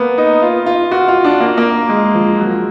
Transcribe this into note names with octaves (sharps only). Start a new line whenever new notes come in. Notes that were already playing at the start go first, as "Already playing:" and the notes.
Already playing: A#3 B3
D#4
F4
F4
F#4
F4
D4
A#3
A#3
G#3
F3
F#3